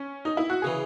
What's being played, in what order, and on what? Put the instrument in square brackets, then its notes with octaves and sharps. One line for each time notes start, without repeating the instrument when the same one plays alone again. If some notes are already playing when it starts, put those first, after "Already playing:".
Already playing: [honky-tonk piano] C#4
D#4
E4
F#4
[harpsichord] C#3 E3 [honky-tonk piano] G#4